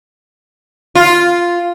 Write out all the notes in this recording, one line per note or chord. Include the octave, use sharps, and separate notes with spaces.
F4